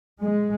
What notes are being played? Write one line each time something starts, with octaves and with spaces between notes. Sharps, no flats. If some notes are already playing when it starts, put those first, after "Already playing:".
G#3